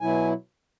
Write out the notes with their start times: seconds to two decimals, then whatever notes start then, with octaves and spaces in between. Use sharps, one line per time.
0.01 B2 F#3 E4 G#5